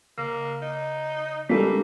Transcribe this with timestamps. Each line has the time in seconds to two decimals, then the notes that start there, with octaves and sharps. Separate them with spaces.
0.18 C#3 A#3
0.62 D#4
1.49 G3 G#3 A#3 C4 D4 G4 A4